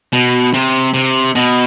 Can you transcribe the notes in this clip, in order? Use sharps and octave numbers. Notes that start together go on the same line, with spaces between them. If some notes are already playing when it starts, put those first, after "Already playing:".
B2
C3
C3
B2